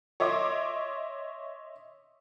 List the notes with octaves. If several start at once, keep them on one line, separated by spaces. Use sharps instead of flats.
C#5 D#5 E5 C6 D6